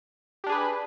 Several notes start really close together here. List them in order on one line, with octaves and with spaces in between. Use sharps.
G4 D4 G#4 B4